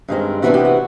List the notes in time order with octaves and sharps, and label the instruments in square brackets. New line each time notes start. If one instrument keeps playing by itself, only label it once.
[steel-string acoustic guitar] G2 D#3 G#3 C4
C3 E3 G3 B3 D4 F#4
G4
F#4